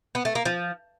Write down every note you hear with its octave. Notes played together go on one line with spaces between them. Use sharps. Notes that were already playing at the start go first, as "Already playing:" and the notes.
B3
A3
A#3
F3